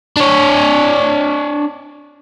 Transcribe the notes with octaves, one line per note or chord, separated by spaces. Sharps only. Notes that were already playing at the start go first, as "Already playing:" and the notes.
D4 C#5